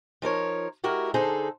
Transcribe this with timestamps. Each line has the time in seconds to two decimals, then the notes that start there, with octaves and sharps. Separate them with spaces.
0.22 F3 D#4 A#4 C#5
0.83 G#3 E4 F#4 G4 A#4
1.14 D3 D#4 G#4 A4 C5